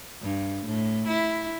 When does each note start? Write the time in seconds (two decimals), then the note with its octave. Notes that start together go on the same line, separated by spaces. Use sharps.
0.22 G2
0.66 A2
1.08 E4